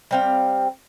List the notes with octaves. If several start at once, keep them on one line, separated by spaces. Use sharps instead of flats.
G3 C4 F5